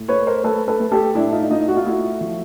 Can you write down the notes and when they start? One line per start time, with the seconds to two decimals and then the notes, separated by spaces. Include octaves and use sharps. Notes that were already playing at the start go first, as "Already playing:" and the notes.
Already playing: A2
0.08 A3 B4 C#5
0.27 A#4 C5
0.44 A3 A4 B4
0.68 A4 B4
0.80 A3
0.92 G4 A4
1.14 A2 D4 E4
1.33 D#4 F4
1.50 A3 D#4 F4
1.68 F#4
1.77 F4
1.85 A3 E4 F#4
2.21 F3